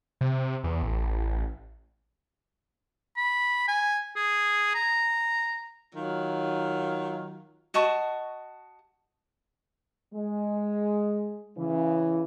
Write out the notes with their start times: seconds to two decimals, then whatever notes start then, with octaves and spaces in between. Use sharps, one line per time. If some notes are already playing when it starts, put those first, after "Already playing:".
0.21 C3
0.64 E2
0.83 A1
3.17 B5
3.68 G#5
4.16 G#4
4.75 A#5
5.94 D#3 F#3 F4
7.74 F#4 D#5 A5 C#6
10.14 G#3
11.57 C#3 E3